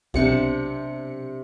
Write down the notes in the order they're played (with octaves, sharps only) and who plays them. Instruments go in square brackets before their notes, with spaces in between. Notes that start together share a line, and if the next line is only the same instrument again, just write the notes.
[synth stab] B1 C#7 [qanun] C3 D4